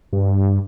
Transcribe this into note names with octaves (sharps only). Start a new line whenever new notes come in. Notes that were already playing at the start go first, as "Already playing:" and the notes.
G2